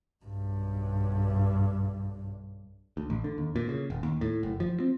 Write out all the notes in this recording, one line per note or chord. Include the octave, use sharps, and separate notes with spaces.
B1 G2
D2
A1
D3
D#2
A#2
C#3
D#1
D#2
A2
F#1
F3
C4